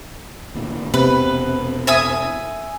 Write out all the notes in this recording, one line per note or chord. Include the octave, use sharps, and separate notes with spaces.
G#1 A#2 D3
E1 C3 B3 B4
E5 G#5 D#6